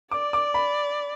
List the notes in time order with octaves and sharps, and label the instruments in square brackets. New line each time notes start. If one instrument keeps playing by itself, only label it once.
[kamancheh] D5 [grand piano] D6
[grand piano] D6
B5